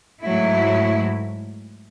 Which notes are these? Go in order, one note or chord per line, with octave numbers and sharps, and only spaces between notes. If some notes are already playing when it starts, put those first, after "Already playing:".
G#2 F#3 A3 E4